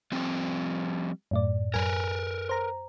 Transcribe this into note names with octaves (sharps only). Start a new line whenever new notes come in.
F3 G3 C4
F#2 A2 D5
F#2 A#4 B4 G#5
C5 A#5